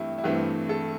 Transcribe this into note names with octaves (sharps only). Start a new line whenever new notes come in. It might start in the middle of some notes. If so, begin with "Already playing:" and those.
Already playing: G2 E3 A3 C4 E4 G4
E4
G2 E3 A3 C4 G4
A4